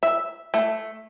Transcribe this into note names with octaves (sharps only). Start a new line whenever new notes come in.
E5
A3